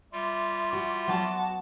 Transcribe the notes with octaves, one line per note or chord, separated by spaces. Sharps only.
G3 F4 E5 C6 D6
F#4 G#5
F#3 B3 F#4 A5